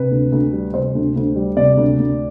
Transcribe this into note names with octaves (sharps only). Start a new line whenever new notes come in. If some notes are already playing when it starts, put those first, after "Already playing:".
Already playing: C3 B4
D2
D2
G3
C3 C5
D2
D2
G3
C3 D5
D2
D2